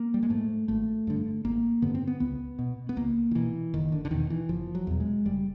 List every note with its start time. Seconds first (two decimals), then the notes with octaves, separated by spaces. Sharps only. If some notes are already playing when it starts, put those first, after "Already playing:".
Already playing: A#3
0.14 G3
0.23 G#3
0.30 G#2 A3
0.68 G#1 A3
1.07 G2 D3
1.45 G#1 A#3
1.82 G2 D3 B3
1.95 C4
2.07 B3
2.20 C#2 B3
2.59 B2
2.89 B3
2.96 C#2 A#3
3.31 D#3
3.35 B2 E3
3.74 F#1 D#3
3.92 D3
4.05 D3
4.11 E2 B2 D#3
4.30 E3
4.49 F#1 F3
4.75 F#3
4.87 E2 B2
5.00 G#3
5.25 F#1 G3